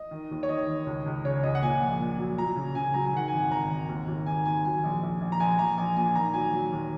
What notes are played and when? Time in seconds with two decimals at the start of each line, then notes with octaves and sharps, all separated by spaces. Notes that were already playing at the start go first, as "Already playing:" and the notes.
Already playing: D#5
0.11 D#3
0.31 D#2
0.43 C#5
0.49 D#3 D#5
0.68 D#3
0.86 C#2
1.06 C#2
1.25 C#3 C#5
1.43 C#2 D#5
1.55 F#5
1.62 A#2 G#5
1.81 A#1
2.00 A#2
2.19 F#3
2.38 F#3 A#5
2.56 C#3
2.75 C#3 G#5
2.94 F#3 A#5
3.06 G#5
3.13 D#3 F#5
3.28 G#1 G#5
3.51 G#1 A#5
3.70 G#1
3.89 D#2
4.08 D#2
4.26 D#3 G#5
4.45 D#2 G#5
4.64 F#3 G#5
4.84 A#1
5.03 A#1
5.21 A#1
5.32 A#5
5.40 A#1 G#5
5.59 A#1 A#5
5.78 A#1 G#5
5.96 A#2 G#5
6.15 D#3 A#5
6.34 F#3 G#5
6.53 F#3
6.72 D#2